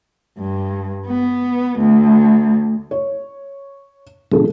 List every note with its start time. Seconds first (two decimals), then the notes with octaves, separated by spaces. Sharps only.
0.38 G2
1.05 B3
1.79 D2
2.91 C#5
4.32 G#2 B2 D3 F3 G#4 A4